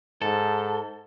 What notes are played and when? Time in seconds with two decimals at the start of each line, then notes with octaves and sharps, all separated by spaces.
0.22 G#2 A4